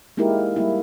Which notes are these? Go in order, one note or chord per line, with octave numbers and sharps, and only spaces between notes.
G#3 A#3 D#4 E4 G4 A#4
G3 A#3 E4